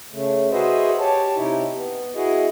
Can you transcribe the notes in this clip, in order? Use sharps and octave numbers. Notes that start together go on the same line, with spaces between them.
C#3 A3
F#4 G#4 B4 C5 D#5 E5
G4 C#5 A5
C3 D#4 E4 G4
B3
E4 F#4 G#4 D#5